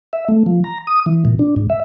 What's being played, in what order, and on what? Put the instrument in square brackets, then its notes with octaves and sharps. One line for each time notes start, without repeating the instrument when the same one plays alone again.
[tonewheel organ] E5
A3
F3
A#5
D#6
E3
A#2
D4
G#2
E5